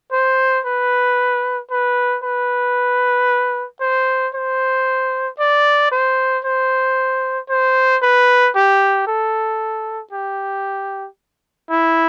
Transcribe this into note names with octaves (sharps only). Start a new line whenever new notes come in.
C5
B4
B4
B4
C5
C5
D5
C5
C5
C5
B4
G4
A4
G4
E4